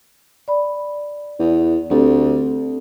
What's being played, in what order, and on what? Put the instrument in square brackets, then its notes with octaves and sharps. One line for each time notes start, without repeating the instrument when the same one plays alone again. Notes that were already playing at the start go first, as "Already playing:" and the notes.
[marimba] D5 B5
[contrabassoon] E2
[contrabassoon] D2 [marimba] C4 G4 A4